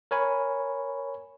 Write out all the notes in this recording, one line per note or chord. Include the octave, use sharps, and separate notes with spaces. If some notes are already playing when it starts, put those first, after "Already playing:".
A#4 C#5 G#5 B5